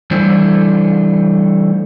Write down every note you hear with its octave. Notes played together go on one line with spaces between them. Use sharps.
E3 G3 A3 D4 E4 C5